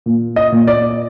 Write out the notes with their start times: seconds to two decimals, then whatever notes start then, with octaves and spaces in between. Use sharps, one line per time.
0.06 A#2
0.36 D#5
0.52 A#2
0.67 D5